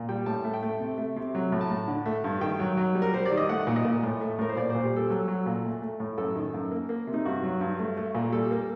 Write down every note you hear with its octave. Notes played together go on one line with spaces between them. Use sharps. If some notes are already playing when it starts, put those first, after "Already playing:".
Already playing: A#2
G3 G5
A2 A5
A3
G5
A3
C3
A3
C3
F#3
A2
A5
A2
D3
A3
G2
D#3 G5
F#3
F#3
G3
A#4
G3 C5
D5
D#3
D#5
A3 F#5
A#2
D#5
A#2
A2
A3
A2 A#4
C5
A#2 D5
A#2 C5
G4
G3 A4
F#3 A4
F#3
A#2
A3
A3
A2
F#2 A4
D#3
F#2
A#3
A#3
C3
D#4
G2 F#4
F#3
G2
A3
A3
A#2
G3 A4
A#3